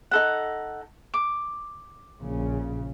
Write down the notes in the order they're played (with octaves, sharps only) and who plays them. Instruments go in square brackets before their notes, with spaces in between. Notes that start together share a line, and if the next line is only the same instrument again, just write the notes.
[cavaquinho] D#4 A4 F#5
D6
[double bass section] A#1 C#3